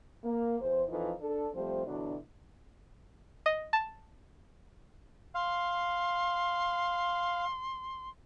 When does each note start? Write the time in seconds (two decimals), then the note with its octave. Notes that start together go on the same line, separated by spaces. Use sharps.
0.24 A#3
0.60 E2 C5
0.89 F2 E3 F3 D#4 F4 A4
1.20 D4 A4
1.54 F3 G3 A3 C4 C5
1.86 B2 D3 E3 F#3 D4
3.46 D#5
3.73 A5
5.35 F5 C6